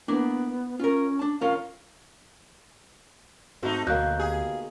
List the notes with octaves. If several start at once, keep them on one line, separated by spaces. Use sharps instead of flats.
A#3 B3 D4 E4
C#4 F4 A#4
D4 A5
C#4 F4 A#4 F5
G#2 A3 C4 D#4 F#4
D2 B2 F#3 A#3 F#6 G6
G4 G#4 F5 G#5